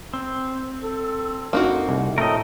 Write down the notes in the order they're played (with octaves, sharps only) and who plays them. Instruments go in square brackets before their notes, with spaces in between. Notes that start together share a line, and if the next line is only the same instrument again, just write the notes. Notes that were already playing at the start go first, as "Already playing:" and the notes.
[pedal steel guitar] C4
[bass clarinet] A4
[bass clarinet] F2 [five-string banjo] A#3 D#4 F#4
[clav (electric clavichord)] C2
[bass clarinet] A2 [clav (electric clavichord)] A3 C4 [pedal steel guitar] A#4 D#5